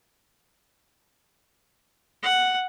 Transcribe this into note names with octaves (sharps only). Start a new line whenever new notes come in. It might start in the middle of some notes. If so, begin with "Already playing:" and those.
F#5